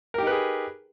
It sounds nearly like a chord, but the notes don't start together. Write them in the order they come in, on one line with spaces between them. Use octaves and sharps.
A#4 G4 D#4 B4 G#4